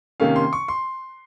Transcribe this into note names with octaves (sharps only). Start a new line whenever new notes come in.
C3 D#3 A#3 C#4 F5
C6
C#6
C6